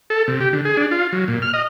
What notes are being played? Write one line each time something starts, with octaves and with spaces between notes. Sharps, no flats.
A4
C3
G4
D3
G#4
D4
F4
F#3
A#2
F6
D#5